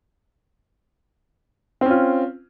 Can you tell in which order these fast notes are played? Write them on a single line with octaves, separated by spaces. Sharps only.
C4 C#4 F4